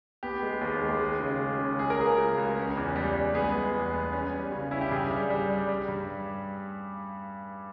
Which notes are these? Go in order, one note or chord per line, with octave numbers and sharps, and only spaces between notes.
B3 G4
G#3
D#2
G#3
G#3
C#3
G#3
C#3
C#2 G#4
A#4
C#2 G#4
C#2
C#2
C#4
E2
G3
G3
B3 G#4
G#3
E2
B3
C#4
G3
C#3
C#4 E4
G4
G2 G#4
G3
G3
G3
G3
G2